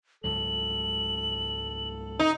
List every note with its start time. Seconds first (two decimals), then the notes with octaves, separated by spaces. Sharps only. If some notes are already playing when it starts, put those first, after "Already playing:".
0.24 C#2 G#2 F#3 A4 F#7
2.20 D#4